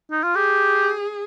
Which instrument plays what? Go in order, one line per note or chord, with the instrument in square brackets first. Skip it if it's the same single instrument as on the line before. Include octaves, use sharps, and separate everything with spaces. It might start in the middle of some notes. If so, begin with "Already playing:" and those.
[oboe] D#4
F4
[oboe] G4 [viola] G#4